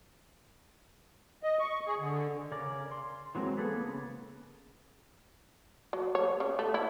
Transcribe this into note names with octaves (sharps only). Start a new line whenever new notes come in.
D#5
C#6
G#4
D3
C#3 C#4 A#4 D5
C6
E3 F#3 G#3 C4 A#4
A#3 B3 G#4 A4 B4
C#3
F#3
C#5
C#3
A3
E4